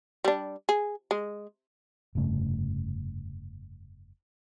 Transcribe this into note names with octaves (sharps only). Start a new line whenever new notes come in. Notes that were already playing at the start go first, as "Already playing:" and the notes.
G3 D4
G#4
G#3
F1 G2 C#3 A3